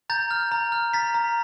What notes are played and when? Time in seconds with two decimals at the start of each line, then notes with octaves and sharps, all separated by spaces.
0.10 A#5 G6 A6
0.31 F6
0.52 A#5
0.72 F6
0.93 A#5 A6 B6
1.15 A#5